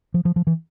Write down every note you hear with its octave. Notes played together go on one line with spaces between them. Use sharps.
F3
F3
F3
E3